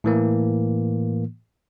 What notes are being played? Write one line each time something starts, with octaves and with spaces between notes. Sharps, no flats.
A2 E3 A#3